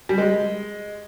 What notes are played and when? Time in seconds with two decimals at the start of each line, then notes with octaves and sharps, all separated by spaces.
0.09 G3
0.18 G#3